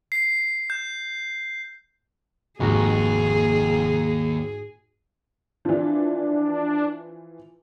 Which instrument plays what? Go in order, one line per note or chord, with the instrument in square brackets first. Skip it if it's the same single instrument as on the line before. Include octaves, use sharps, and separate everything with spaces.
[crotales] C7
G6
[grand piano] F1 [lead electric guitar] D#2 [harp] G#2 F#4 A#6 [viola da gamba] G#4
[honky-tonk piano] E3 F3 [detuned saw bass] D4